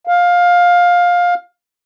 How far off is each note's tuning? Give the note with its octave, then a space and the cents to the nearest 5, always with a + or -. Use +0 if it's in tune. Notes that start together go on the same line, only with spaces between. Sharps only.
F5 +15